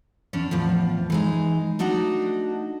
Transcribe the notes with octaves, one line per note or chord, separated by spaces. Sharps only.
E2 C#4 D4
E2 A2 F3
E3 G#3 D#4
A3 D4 D#4 F#4